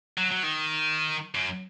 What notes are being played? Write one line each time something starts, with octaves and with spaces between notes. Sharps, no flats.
F#3
F#3
D#3
F#2